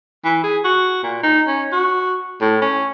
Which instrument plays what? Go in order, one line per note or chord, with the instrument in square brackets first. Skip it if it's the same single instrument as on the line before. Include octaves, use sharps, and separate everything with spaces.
[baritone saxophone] E3
G#4
F#4
A#2
D#4
C#4
F#4
A2
C#4